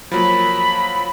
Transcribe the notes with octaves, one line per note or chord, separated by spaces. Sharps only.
F3 F#3 A#3 B5